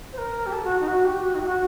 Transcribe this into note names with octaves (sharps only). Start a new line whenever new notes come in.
C5
A#4
G4
A4
F#4
D#4
F#4
G4
F#4
D#4
G4
F#4